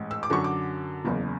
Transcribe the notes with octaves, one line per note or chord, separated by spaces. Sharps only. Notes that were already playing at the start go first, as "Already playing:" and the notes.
Already playing: A1 G#2
E6
D6
F#2 D3 F#3 C#6
D6
F#1 E2 C#3